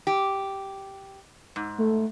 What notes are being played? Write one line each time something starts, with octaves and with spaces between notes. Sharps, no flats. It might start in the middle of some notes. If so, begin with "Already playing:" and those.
G4
G#2
A3